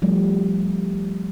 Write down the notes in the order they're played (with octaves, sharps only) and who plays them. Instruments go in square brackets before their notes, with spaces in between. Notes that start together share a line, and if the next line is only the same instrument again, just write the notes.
[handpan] F3 G3 A3